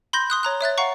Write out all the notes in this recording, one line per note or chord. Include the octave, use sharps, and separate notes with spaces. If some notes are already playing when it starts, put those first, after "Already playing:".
B5 C6 G6 A#6
C6 D#6 F#6
C#5 A#5 F#6
C#5 E5 F#6 A6
F5 F#5 A#5 C#6